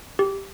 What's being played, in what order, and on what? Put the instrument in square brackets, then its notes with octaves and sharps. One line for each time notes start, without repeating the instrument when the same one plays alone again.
[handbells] G4